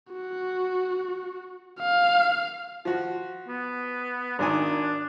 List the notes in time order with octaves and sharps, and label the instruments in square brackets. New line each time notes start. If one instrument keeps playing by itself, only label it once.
[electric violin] F#4
F5
[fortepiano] F3 F#4
[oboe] B3
[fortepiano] G#1 D#3 G#5 [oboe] D4